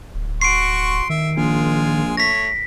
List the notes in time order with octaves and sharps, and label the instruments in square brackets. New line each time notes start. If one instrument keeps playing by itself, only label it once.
[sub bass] D1
[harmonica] F#4 C6 C#6 [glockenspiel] C7 D7
[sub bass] D#3 [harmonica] E5
[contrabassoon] A#1 [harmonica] G#3 F4 G#5
[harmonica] A3 C#5 [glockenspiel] A#6 B6